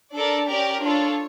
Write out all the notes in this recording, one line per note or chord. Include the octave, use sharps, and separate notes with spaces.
D4 A4 A#4 D5
C#4 G4 A#4 D5
D4 F4 A4 C#5